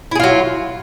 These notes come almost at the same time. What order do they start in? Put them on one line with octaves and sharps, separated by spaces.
E4 G#4 F4 F#3